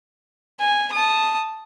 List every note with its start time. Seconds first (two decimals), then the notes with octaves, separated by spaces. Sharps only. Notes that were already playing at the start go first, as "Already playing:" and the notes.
0.60 G#5
0.93 A5 D#6